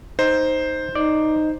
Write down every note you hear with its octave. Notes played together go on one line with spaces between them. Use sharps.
D#4 C5
D#4 D5